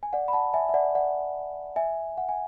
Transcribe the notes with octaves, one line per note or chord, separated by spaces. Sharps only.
G#5
D5 F#5
B5
F#5 A5
E5 G#5
E5
D5 F#5
D5 F#5
E5 G#5
F#5
G#5